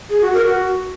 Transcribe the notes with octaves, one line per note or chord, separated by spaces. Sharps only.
G#4
F#4
A#4
F#4